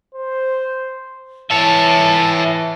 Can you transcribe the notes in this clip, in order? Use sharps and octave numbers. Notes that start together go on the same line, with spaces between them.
C5
E3 C#5 E5 A5